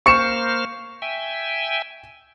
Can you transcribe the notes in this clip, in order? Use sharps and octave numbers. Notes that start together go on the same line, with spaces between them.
A#3 C5 C#6 F6 C#7 E7
E5 G5 G#5